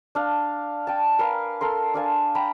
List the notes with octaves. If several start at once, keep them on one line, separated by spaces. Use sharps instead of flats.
D4 F5
G5 A5
A#4 B4 F5 G#5
A4 A#4 C6
D4 F5 G#5 A5
G5 A#5 B5